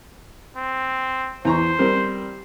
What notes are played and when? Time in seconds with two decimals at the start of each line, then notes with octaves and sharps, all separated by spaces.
0.56 C4
1.45 E2 C5 A#5 C#6
1.79 G3 C4 A#4